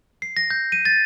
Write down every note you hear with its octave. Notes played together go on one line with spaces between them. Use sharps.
C7
A#6
G6
D#7
A6